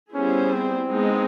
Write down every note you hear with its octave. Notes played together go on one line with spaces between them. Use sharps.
G3 B3 C#4 E4 G#4 C5
C4
G#3 B3 D#4